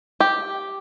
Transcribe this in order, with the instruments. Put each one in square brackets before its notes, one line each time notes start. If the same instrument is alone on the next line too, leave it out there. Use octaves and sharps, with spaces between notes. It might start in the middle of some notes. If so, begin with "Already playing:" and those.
[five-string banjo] G4